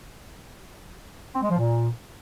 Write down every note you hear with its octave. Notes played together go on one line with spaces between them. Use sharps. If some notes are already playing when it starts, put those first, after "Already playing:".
C4
G#3
F3
A#2